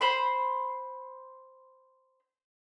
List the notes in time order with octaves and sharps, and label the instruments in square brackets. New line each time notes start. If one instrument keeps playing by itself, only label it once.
[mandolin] C5 B5 C6